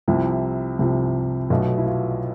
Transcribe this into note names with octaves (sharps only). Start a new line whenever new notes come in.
C2 C3 F3 E4
C2 C3 F3
B1 B2 A3 F4
E4
F4